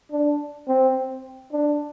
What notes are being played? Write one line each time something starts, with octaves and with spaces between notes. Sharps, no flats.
D4
C4
D4